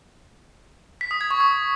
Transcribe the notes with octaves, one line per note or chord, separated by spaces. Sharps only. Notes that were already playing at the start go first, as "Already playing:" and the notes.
B6
D#6
G#6
C#6
D#6